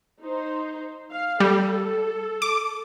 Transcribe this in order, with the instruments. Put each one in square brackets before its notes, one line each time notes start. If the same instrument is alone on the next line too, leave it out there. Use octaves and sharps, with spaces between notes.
[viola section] D#4 C5
F5
[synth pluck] G3 [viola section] A4
[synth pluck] D6